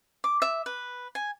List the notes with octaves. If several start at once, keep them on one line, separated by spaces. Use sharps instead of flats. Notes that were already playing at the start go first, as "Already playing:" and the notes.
D6
E5
B4
G#5